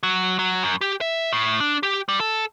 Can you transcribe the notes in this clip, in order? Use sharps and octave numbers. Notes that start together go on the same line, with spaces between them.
F#3
F#3
F#2
G4
E5
A2
D4
G4
G3
A4